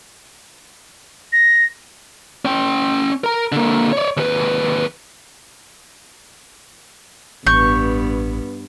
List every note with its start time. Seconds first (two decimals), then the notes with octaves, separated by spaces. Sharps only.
1.33 A#6
2.45 C#4 G5
3.24 A#4 A#5
3.52 D3 A#3
3.93 C#5 D5
4.17 D#2 B4
7.46 A1 G2 B3 C#6 G6